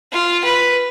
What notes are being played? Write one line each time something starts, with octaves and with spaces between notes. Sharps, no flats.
F4
B4